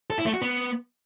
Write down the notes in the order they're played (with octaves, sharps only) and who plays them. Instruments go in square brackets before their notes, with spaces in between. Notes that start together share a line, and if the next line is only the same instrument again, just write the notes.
[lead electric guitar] A4
E4
A3
F#4
B3